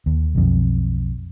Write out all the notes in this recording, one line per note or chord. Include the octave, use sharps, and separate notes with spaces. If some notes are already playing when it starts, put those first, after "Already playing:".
D#2
B1 F2